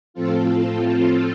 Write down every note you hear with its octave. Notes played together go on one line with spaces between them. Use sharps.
A2 F3 C4 F4 A4
F4 A4